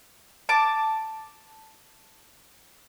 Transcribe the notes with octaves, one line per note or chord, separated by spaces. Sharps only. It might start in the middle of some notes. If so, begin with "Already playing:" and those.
A5 D6